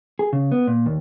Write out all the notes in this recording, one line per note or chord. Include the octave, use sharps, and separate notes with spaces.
G#4
C#3
B3
A#2
D#2